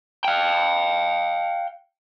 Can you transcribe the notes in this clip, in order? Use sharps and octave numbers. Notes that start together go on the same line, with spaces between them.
F5 G5